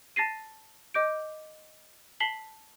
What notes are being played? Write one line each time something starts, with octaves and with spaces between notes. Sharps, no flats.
A5 A6 A#6 C7 D#7
D#5 D6 G6 D7
A5 B6 C7 F#7 G7